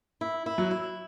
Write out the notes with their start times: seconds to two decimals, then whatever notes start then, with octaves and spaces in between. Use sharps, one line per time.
0.21 E4
0.46 E4
0.58 F#3
0.71 E4